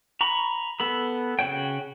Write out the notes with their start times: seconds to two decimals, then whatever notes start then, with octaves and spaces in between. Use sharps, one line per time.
0.21 A#5 B5 C#6
0.80 B3 A4 B5
1.39 C#3 F#4 C#5 G5